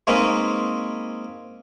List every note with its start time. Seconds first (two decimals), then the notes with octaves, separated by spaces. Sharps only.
0.07 G#3 A#3 C4 C#4 D#4 B4